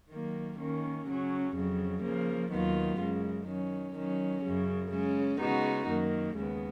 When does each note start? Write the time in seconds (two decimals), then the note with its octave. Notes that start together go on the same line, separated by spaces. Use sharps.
0.10 D#3 F#3 A#3
0.58 D#3 A#3 C#4
1.07 C#3 F#3 C#4
1.55 F2 C#3 F#3
2.02 C#3 F3 A#3
2.51 D#2 D#3 F#3 B3 F4
2.99 F#2 C#3 G#3
3.47 D#3 F#3 C#4
3.95 D#3 F#3 C#4
4.44 F#2 C#3 F#3
4.91 C#3 G#3 C#4
5.39 C#3 G#3 B3 D#4 F#4
5.88 F#2 D#3 A#3
6.36 D#2 C#3 G#3 B3